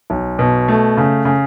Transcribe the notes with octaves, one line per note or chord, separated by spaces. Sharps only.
B1
B2
A3
C#3
C#3